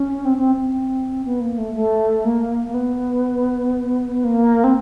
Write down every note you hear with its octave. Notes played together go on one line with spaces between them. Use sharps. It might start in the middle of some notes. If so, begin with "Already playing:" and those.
Already playing: C#4
C4
C4
C4
B3
A#3
A3
A3
A#3
A#3
B3
A#3
C4